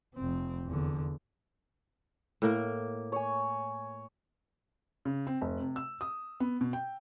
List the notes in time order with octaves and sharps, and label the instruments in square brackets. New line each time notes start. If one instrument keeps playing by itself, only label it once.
[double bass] F1 C4
E2 D3
[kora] A2 A#3 A#4
[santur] C#5 G#5
[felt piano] C#3
C4
F1
C3
E6
D#6
B3
B2
G5